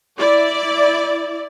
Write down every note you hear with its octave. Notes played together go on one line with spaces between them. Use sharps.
E4 D5